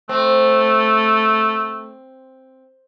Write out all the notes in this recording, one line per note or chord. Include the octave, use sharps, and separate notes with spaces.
A3 C4